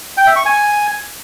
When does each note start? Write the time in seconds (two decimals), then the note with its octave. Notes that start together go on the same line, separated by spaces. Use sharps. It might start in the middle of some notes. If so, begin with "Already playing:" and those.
0.17 G5
0.27 E5
0.36 C#6
0.45 G#5